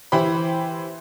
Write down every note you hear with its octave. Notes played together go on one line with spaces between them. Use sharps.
E3 E4 G4 C5 B5